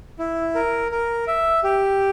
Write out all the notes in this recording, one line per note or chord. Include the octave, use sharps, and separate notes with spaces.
E4
A#4
A#4
E5
G4